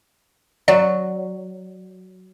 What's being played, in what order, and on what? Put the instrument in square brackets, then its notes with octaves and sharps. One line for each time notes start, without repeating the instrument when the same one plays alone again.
[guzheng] F#3 [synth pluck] D5